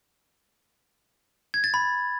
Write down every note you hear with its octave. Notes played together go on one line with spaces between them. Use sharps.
G#6
A6
B5